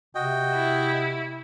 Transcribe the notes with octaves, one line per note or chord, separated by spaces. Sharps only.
C3 F#4 D#5 G5
E4